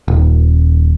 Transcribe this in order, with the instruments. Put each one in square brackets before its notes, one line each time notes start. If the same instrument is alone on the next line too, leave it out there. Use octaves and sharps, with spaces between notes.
[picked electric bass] D#1